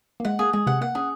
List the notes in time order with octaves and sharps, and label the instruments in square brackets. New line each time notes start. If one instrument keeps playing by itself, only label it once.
[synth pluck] A#3
[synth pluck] G#3 [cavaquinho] F#5
[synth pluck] A#3 [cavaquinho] G#4
[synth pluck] G#3 [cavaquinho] G#4
[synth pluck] C3 [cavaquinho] F#5
[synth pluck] A#3 [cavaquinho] F#5
[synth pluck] C#4 [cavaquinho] G#4